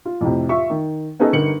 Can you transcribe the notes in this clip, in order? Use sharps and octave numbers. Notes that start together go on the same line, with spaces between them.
F4
F2 A2 C3
F4 E5 C#6
D#3
B3 C#4 D#4 G#4 A4 D#5
G1 D#4 A#4 C#7 F#7